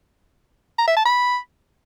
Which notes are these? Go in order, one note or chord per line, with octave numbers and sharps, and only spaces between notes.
A#5
E5
A5
B5